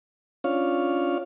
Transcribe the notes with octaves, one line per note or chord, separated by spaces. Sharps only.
C#4 D4 F4 C#5 F5